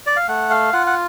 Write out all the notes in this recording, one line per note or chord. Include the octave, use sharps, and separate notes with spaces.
D5
F5
A3 F#5
F5
F4 F#5
F#5